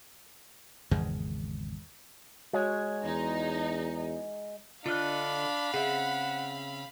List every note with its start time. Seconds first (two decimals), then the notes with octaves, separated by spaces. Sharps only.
0.91 G#1 E2 C#3 G#3
2.53 G#3 F#4 C#5 G#6
3.04 E2 D#4
4.86 D3 D4 F4 D#5 F5 B5 F6 F#6
5.74 C#3 C4 G#4 E5 F#5